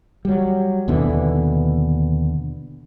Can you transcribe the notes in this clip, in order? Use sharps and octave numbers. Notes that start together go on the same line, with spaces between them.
F#3 G3
D#2 B2 D3 E3